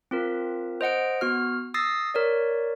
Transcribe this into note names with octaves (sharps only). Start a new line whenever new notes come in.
C4 F4 A#4
C5 D#5 F#5 D7
B3 F#4 F6
D#6 E6 A6 A#6 C7
A#4 C#5 D5